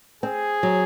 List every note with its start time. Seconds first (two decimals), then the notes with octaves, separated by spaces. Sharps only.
0.23 C4 G#4
0.63 F#3